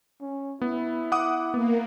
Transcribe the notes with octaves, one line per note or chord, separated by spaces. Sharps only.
C#4
B3 E4
F#5 D6 D#6
A#3 B3